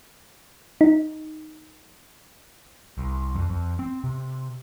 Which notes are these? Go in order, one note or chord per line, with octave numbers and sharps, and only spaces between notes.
D#4
C2
F2
F2
C4
C3